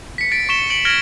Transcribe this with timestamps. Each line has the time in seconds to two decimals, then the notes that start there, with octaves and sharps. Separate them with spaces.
0.18 B6 C#7
0.31 A6 B6 D7
0.49 C#6 B6 E7 G7
0.70 C#7 D7 F#7
0.85 F6 G#6 A#6 D7 F#7 G7